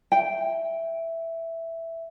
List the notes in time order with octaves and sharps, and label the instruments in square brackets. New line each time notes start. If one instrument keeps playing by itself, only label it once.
[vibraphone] E5 [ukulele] G5